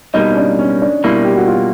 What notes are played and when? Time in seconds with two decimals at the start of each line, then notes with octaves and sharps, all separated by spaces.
0.14 B2 G3 A#3 D#4
0.31 C#4
0.37 D4
0.59 C#4
0.82 D4
1.04 B2 G3 A#3 E4
1.25 G4
1.37 F#4
1.48 F4